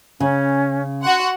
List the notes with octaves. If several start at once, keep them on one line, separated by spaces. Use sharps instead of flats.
C#3 C#4
F#4 F#5 C6